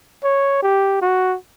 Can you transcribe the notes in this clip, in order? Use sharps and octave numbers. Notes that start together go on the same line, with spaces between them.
C#5
G4
F#4